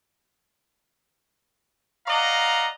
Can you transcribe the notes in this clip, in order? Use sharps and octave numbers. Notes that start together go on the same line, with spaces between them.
D5 D#5 F5 F#5 A#5